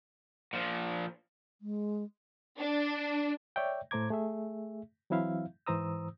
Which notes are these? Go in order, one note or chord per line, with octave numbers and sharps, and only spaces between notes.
A#2 F3
G#3
D4
C#5 D5 E5 G5
A2 A3 C5 A#5 D6 G#6
A3 G#4 E5
E3 F#3 C4 E4 E5 F5
G#2 E3 C5 A#5 D#6 E6